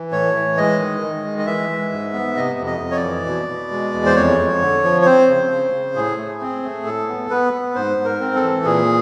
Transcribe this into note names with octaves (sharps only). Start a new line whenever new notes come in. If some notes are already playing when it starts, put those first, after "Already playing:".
Already playing: E3
A2 C#5
E3
G#3 D#5
D#3
D#3
G#3
D#5
E3 E5
G#3
G#2
B3
C3 D#5
F2
D#5
F2
C#5
D5
E3
B2
B2
G#3
E2
C5
F2 C#5
F2
D3
F3
C#5
C4 C5
C#3
C#3
C#3
A2 G#4
A3
C4
A3
A2 A4
B3
B3 B4
B3
G#2 C5
G#2
A#4
C4
A4
E3
A#2 G#4